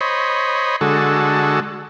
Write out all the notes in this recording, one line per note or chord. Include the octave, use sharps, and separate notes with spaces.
C5 C#5 D#5 B5
D3 G#3 F#4 A4